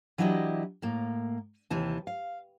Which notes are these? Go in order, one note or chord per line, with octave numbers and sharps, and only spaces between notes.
E3 F#3 D4 E4 G4 D#5
A2 A#3
D#2 C3 E3 A5
F5